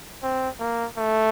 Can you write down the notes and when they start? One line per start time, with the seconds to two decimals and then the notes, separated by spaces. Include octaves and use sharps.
0.23 C4
0.60 A#3
0.98 A3